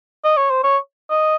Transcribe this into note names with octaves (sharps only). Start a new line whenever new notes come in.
D#5
C#5
C5
C#5
D#5